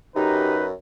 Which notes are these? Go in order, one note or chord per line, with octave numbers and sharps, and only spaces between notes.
F#2 D#4 G4 B4